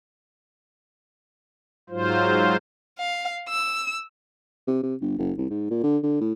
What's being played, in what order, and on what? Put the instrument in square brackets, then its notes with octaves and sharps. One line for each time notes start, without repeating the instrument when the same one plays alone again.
[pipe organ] G#2 F#3 F4 C5
[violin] F5
E6
[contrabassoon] C3
C3
G1
F#1
C2
G#2
A#2
D3
D3
A2